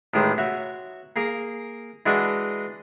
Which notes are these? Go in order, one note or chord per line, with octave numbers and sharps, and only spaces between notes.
A1 A2 D#3 G#3
F#4 C#5 E5
A#3 G#4 A#4
E3 G#3 D4 F#4 G#4